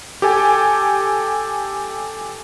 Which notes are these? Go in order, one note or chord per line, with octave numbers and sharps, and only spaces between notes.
G4 A4 G#5